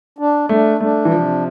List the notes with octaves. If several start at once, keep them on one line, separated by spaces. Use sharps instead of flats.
D4
A3 D4
A3 D4
E3
C3 F3